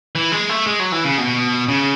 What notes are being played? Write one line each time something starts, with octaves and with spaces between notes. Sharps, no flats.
E3
G#3
A3
G#3
F#3
E3
C#3
B2
C#3